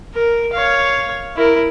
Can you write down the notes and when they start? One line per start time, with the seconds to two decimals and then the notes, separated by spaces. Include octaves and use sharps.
0.15 A#4
0.54 C#5 F5
1.37 E4 A#4